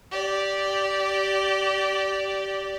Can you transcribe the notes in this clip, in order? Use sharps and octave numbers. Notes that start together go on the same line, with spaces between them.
G4 D5